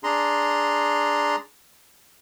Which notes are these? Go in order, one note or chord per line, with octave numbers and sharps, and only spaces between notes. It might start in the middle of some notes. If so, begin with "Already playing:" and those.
D4 G#4 A#5 C6